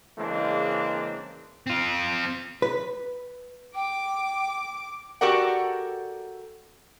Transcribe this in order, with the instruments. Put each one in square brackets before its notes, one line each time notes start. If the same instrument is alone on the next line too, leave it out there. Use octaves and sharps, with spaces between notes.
[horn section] C#3 E3 G#3 A#3 C4 D4
[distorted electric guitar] C4 F4
[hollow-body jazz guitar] B4
[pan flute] G5 [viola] D6
[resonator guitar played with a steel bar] F#4 G4 A4 A#4 D5 F#5